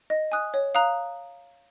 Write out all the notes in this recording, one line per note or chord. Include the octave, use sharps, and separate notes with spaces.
D#5
G#5 D#6 F#6
C#5
F5 A#5 D#6 F#6